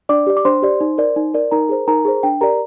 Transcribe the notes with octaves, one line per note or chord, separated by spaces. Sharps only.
D4 D5 D6
G4 D5
D6
D4 C5 C6
G4 D5
D#4
A#4 D5
D#4
A#4 D5
D#4 A#4 A#5
G#4 C5
D#4 A#4 A#5
G#4 C5
D4 G5
G4 A#4 D5 A#5